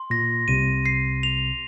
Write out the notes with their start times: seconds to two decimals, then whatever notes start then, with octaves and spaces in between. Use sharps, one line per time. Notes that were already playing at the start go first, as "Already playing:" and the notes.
Already playing: C6
0.10 A#2 A#6
0.48 C2 C3 D#7
0.86 C7
1.23 F7